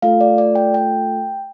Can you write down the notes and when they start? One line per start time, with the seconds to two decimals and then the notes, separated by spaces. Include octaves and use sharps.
0.02 A3 F4 A4 F5
0.21 D5
0.38 D5
0.55 G5
0.74 G5